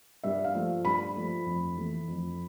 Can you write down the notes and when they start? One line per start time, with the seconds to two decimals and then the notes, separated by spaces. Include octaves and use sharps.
0.23 G2 E5
0.44 F5
0.54 F3 A3
0.85 G2 B5
1.16 F3 A3
1.46 F2
1.77 E3 A3
2.08 F2